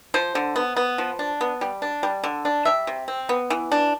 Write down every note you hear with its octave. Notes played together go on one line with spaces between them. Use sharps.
F3 C5
D3
B3
B3
F3
D4
B3
G3
D4
G3
D3
D4
G3 E5
C3
C4
B3
E3
D4